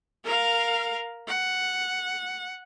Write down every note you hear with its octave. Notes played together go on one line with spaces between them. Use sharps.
A#4 F5
F#5